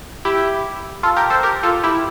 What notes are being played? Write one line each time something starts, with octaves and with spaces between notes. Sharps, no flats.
E4 G4
F4 A4
G4 A#4
A4 C5
G4 A#4
F4 A4
E4 G4